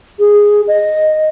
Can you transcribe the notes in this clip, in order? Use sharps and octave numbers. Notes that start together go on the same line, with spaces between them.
G#4
D#5